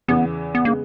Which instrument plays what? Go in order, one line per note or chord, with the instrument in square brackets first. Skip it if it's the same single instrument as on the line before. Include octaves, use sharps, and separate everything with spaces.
[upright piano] E2 C#3 E3 [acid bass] B3
[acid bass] B3
[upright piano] C#3 G#3 B3 [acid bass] A#3